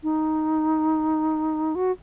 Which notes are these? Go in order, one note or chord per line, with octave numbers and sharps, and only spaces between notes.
D#4
F#4